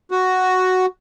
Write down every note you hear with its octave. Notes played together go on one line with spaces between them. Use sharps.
F#4